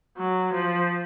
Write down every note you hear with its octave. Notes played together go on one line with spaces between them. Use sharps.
F#3
F3